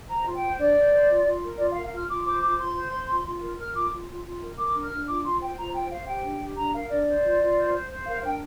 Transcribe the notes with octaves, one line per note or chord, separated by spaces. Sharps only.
C5 A#5
F4
G5
C5
D4 D5
C5
C5
F4
F4
A#4
F4 D5
F5
A#4
F5
F4 F6
F4 D6
C5 D6
F4 D6
F4 C6
C5
C5
F4
F4
A#4
A#4 F6
F4 D6
F4
F4
F4
A#4
A#4 D6
D4
F6
D4
F4 D6
F4 C6
C5 G5
F4 A#5
C5 G5
C5 F5
G4 G5
D4
G4
D4 A#5
A#4 F5
D4 D5
C5
F4
F4
C5
C5
C5
A#4 F5
D4 G5